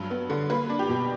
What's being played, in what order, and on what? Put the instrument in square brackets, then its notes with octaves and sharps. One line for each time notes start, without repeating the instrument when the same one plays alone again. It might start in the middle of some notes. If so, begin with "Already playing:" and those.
Already playing: [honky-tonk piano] G2 F#3
B3
D3
A#3 B4
D4
G4
B2